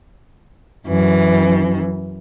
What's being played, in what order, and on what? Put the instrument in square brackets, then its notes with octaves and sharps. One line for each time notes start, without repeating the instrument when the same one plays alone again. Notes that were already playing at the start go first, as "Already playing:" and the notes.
[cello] F#2 E3